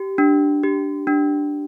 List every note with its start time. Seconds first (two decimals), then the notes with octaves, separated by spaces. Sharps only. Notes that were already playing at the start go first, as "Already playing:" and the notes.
Already playing: G4
0.18 D4
0.63 G4
1.07 D4